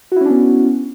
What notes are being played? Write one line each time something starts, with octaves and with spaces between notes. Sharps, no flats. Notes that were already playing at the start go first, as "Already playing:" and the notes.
B3 C#4 D4 E4 F#4